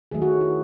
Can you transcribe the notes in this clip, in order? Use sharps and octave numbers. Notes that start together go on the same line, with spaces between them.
D#3 F#3 A3 G#4
F#4
E4